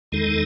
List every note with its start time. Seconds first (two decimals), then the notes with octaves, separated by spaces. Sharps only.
0.12 E2 D#3 G#3 D#4 A4